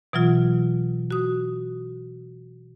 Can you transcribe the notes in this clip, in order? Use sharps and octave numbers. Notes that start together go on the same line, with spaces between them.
B2 E3 F#3 F4
F#4 D#6